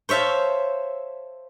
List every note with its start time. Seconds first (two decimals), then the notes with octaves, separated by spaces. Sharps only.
0.09 C5 C#5 E5 F5 A5